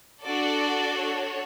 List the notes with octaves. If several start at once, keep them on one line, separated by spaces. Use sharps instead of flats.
D4 F#4 A4 D5
C#5